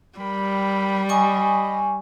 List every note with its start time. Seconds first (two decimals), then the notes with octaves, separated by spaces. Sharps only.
0.19 G3 A#4 G5 B5
1.09 D#5 G#5 B5 C#6